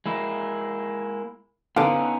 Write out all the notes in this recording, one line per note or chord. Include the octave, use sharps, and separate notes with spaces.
G#3 A#3 E4
D3 B3 C#4 D#4 F5 D6